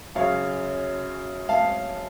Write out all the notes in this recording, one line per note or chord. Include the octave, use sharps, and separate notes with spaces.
F#2 C#3 C#5 F5
F5 A5